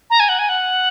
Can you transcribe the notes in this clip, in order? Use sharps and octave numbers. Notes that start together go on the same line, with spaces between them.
A#5
G#5
F#5
G#5
F#5